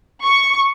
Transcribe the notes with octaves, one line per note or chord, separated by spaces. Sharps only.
C#6